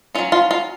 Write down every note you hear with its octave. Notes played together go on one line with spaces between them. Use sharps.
F#3 C#4 F4
F4
F4